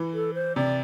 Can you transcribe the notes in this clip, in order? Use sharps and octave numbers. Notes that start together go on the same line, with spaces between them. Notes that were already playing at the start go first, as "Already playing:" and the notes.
Already playing: E3
A4
C5
C3 D5